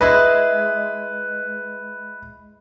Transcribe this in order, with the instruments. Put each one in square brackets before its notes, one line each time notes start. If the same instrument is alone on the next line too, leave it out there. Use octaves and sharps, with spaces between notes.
[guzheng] G#3 E4 D#5 [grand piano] B4